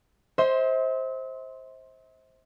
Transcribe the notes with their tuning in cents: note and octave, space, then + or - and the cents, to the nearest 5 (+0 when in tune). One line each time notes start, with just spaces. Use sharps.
C5 +10 E5 -45 C6 +0